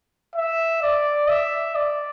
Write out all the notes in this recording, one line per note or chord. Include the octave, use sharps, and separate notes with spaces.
E5
D5
E5
D5